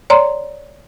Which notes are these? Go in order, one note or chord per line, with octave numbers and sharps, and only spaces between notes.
C#5 D5 A#5 C6